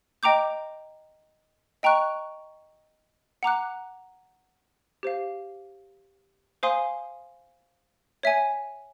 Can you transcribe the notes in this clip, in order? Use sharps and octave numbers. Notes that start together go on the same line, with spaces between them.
D#5 G5 A#5 D6 G6
D#5 G5 A#5 C#6 F#6
F#5 A#5 D6 F#6
G4 C5 F5
C5 F5 G#5 C6 D#6
C#5 E5 G#5